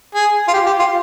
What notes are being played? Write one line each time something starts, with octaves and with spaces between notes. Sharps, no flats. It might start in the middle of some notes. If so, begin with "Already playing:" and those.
G#4
F4
G4
G4
F4